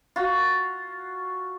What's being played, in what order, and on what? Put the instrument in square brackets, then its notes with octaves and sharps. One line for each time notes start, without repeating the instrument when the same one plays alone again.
[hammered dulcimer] F4 F#4